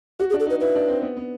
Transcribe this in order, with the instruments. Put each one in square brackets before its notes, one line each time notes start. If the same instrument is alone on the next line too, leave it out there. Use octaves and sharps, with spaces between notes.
[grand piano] F#4 [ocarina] G4
[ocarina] G#4
[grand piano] D4
[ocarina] A4
[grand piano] D#4 [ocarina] B4
[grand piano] E4 [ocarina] B4
[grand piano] D4
C4
B3
B3